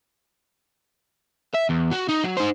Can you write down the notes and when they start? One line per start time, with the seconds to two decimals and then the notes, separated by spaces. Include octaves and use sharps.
1.55 E5
1.70 E2
1.93 F#4
2.09 D#4
2.24 F#3
2.37 D#4 C5